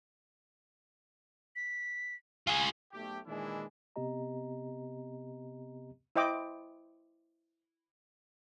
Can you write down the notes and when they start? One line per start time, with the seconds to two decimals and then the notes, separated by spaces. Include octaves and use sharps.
1.56 B6
2.47 F4 G#4 G#5
2.93 B1 A3 G4
3.27 A#2 D#3 E3 G#3 D4 E4
3.96 C3 B3 C4 G4 D#5 A#5
6.16 E4 C5 D#5 G5 D6